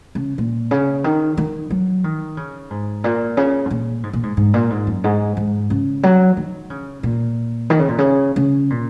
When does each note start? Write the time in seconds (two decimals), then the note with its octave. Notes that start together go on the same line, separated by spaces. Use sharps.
0.15 C#3
0.38 A#2
0.71 C#3
1.04 D#3
1.37 D#3
1.70 F#3
2.04 D#3
2.37 C#3
2.70 G#2
3.04 A#2
3.37 C#3
3.66 G#2
3.71 A#2
4.03 G#2
4.13 A#2
4.23 G#2
4.37 G#2
4.54 A#2
4.70 G#2
4.87 F#2
5.04 G#2
5.37 G#2
5.70 C#3
6.03 F#3
6.37 D#3
6.70 C#3
7.03 A#2
7.70 D#3
7.79 C#3
7.88 A#2
7.99 C#3
8.36 C#3
8.70 A#2